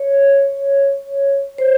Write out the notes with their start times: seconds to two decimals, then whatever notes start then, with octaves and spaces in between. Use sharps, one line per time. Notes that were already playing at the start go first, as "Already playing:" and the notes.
Already playing: C#5
1.58 C5